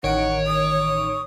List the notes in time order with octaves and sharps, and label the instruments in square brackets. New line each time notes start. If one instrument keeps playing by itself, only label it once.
[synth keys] A1 D#3 D7 [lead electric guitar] C#5 [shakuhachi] F#5
[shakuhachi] D#6